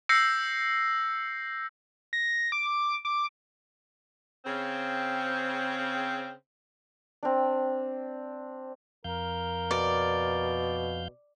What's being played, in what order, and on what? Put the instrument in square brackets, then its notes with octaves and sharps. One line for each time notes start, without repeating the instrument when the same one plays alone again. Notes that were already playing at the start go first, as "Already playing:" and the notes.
[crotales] E6 G6 A#6 C7 C#7
[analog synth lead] A#6
D6
D6
[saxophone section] C#3 C4
[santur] C4 D4
[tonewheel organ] F2 F5 G6 [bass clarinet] A#4
[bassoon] B2 [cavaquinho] D5